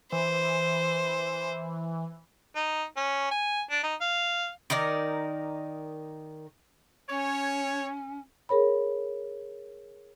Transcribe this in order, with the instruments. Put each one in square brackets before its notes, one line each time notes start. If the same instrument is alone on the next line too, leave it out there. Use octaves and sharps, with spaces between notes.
[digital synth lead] E3 [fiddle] C5
[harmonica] D#4
C#4
G#5
D4
D#4
F5
[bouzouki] D#3 D#4 A#4 D5
[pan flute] C#4 [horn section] C#5
[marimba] G#4 A#4 C#5 B5